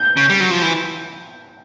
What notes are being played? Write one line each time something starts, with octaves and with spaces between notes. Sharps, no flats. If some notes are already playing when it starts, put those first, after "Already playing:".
Already playing: G6
C#3
G3
F#3
F3
E3